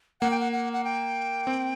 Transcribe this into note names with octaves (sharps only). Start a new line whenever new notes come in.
A#3 F#5
G5
F#5
F#5
F#5
G5
C4